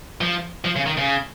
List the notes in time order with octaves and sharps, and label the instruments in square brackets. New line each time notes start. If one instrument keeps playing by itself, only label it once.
[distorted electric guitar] F3
F3
C#3
D#3
C#3